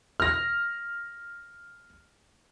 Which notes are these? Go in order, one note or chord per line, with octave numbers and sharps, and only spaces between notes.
F6 A#6